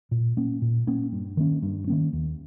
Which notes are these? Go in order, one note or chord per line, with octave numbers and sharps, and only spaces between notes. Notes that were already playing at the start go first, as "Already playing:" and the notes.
A#2
A#3 C#4
A#2
A#3 C#4
G2
D#3 A#3 C#4
G2
D#3 A#3 C#4
D#2